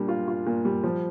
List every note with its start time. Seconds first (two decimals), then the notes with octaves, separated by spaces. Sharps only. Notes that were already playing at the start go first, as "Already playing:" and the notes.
Already playing: A#2 G3 D4
0.08 F4
0.28 F4
0.46 A#2
0.65 G3
0.83 F3